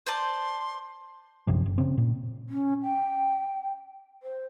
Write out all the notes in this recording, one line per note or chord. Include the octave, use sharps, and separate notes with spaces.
C5 D5 A5 C6
A#1 F#2 C3 F3
F#1
C#3 C4
A#2
C#4
G5
C5